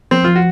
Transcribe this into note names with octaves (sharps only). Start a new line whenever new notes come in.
F3 C4
F3 F4
F#4